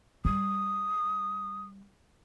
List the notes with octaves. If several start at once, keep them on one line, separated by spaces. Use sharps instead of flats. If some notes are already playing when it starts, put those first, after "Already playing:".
G3 D#6